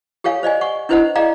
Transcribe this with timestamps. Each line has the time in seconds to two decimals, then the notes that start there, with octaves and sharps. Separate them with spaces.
0.24 G4 A4 C#5 F5 G#5
0.43 C5 D5 D#5 G#5
0.61 F#5 C#6
0.89 D4 E4 B4 C5 D#5 F#5
1.16 G#4 D5 D#5 F5 G5 A#5